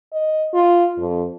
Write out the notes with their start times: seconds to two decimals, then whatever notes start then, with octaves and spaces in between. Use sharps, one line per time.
0.12 D#5
0.53 F4
0.99 F2